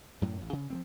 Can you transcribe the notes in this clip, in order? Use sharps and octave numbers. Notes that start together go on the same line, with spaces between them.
F#2 A2 F#3
A1
C#3
F3 G#3 C4